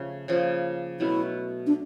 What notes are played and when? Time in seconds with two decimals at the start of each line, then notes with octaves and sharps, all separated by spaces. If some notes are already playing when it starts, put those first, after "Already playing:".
Already playing: C#3 F3 A3 C#4
0.28 C#3 F3 A#3
1.00 B2 F#3 A3 C#4 E4
1.67 D4